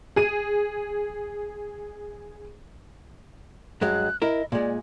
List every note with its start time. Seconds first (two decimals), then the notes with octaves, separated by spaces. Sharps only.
0.16 G#4 D#7
3.81 G2 F#3 G#3 F#6
4.22 E4 A#4 D#5
4.52 A#2 G#3 D5